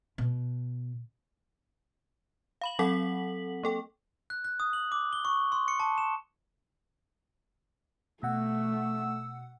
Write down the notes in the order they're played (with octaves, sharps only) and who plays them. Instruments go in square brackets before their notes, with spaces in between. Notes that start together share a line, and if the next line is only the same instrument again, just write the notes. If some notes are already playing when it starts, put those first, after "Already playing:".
[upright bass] B2
[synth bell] F5 B5 F#7
F#3 C4 A4 F#5 B6 F#7
A#3 A4 G5
[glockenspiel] F#6
F#6
D#6
F#7
D6
G7
C#6
C6
C#7
A5
E7
[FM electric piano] B2 F#5 [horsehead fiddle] A3 [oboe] E6